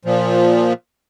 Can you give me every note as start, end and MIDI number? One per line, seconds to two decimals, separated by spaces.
0.05 0.73 46
0.05 0.73 53